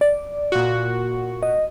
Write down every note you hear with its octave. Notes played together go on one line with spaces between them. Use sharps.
D5
A#2 F#4
D#5